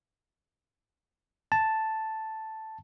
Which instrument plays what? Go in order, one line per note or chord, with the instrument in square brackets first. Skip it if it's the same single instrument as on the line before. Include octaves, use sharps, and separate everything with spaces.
[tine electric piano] A5